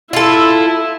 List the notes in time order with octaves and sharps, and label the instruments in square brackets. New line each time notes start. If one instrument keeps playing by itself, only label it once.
[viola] E4 [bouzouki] F4 A4